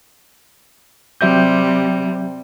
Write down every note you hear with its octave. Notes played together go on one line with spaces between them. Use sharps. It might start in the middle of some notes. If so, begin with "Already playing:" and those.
C3 F#3 G3 E5 G6